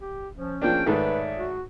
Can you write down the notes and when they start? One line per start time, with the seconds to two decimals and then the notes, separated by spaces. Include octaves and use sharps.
0.01 G4
0.37 F3 C#4
0.62 F3 A#3 D4 G#4 G5
0.86 G#2 D#3 A3 B4 C#5 D5 E5
1.37 F#4